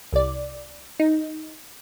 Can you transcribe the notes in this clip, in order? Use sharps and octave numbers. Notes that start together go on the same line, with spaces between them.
C2 D5
D#4